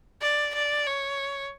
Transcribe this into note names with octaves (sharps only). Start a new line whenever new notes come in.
D5
D5
C#5